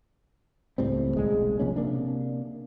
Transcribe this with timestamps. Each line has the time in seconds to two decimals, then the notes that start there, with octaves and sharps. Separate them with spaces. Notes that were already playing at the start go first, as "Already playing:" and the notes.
0.78 C#2 A2 G3 C4
1.17 D#1 B1 G#3
1.59 C3 F3 A#3 C#4
1.76 C3 A#3 D4